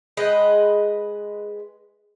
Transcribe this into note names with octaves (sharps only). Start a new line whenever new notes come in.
G#3 B4 D#5 G5